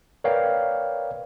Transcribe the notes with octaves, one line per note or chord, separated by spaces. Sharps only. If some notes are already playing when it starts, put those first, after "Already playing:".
A#4 B4 C#5 D5 F5 G5